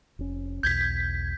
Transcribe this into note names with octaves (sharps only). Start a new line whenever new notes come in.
F1 C#4
B1 E2 B2 G6 G#6 B6